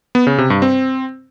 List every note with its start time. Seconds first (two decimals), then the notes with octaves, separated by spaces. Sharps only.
0.15 B3
0.27 C#3
0.38 C3
0.50 G2
0.62 C4